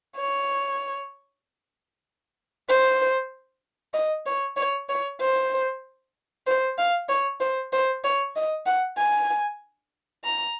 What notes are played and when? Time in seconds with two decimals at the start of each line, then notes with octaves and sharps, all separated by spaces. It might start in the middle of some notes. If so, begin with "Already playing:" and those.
0.16 C#5
2.69 C5
3.94 D#5
4.26 C#5
4.57 C#5
4.89 C#5
5.21 C5
6.47 C5
6.78 F5
7.09 C#5
7.40 C5
7.72 C5
8.04 C#5
8.36 D#5
8.66 F#5
8.98 G#5
10.24 A#5